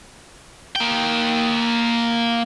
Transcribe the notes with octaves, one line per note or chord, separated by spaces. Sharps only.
A#3 G5